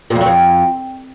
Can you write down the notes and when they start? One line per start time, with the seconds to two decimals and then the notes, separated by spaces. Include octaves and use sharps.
0.10 A#2
0.15 F2
0.21 F#3
0.26 F2